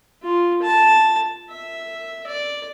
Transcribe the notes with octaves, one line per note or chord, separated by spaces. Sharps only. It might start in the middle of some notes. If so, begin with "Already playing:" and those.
F4
A5
E5
D5